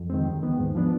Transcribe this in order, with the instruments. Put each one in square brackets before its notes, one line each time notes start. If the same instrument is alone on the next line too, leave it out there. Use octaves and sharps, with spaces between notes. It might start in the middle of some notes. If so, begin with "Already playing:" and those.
Already playing: [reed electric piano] F2
D#3 G#3 C4
D#2
D#3 B3
G#2
F3 B3 D4